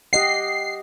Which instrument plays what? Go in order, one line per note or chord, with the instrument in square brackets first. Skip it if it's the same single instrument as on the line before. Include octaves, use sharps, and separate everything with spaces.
[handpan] G4 D#5 F#5 [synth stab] C7